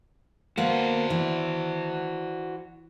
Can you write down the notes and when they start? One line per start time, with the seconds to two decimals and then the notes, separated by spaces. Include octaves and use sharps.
0.57 A#3 B3 F#4 C5
1.10 E3